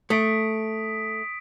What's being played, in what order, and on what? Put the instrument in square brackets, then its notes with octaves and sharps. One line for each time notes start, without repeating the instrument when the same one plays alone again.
[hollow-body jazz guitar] A3 [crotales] D#6 B6 D7